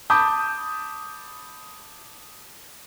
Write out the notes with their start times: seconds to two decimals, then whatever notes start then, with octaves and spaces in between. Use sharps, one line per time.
0.10 A5 B5 D6 D#6 G6